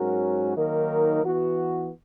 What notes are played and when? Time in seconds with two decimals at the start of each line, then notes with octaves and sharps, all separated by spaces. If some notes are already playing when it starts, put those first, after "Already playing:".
Already playing: G#2 F#3 C#4 F#4 A#4
0.55 D#3 F#3 A#3 D#4 A#4
1.22 E3 B3 F#4